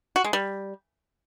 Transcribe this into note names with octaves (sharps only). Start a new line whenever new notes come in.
F#4
G#3
G3